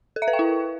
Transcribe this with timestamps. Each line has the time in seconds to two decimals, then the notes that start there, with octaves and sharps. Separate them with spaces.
0.16 A4
0.22 E5
0.28 B4
0.33 G5
0.39 E4